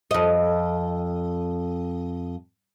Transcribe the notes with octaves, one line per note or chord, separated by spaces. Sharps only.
F2 D#5